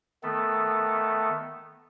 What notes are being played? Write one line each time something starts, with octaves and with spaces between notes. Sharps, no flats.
D#3 A3 B3 A4